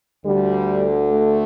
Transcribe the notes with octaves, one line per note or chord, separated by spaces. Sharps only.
D2 D3 G3
A3